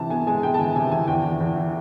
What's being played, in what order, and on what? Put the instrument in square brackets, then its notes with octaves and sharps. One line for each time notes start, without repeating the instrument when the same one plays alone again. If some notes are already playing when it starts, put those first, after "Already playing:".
Already playing: [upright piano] C3 E3 A5
B3 G#5
G#3 G#5
B3 G5
A5
E3 G#5
C3 G#5
E3 G#5
E2 G5
E2
E2
E3